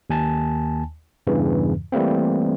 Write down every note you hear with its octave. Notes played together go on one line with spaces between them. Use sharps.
D#2 G#5 A5
E2 G2 C#3 E3
E3 G3 A3 A#3 C4